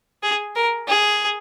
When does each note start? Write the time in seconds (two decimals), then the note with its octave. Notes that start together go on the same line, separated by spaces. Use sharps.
0.23 G#4
0.55 A#4
0.88 G#4